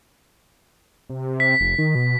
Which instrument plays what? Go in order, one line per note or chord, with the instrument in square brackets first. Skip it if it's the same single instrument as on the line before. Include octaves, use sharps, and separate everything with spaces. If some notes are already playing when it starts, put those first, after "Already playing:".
[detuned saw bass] C3
[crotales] B6
[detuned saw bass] F1
D#3
B2